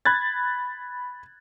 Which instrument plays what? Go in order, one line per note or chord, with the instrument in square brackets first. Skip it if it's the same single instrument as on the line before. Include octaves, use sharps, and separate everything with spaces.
[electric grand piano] B5 F#6 G#6 A6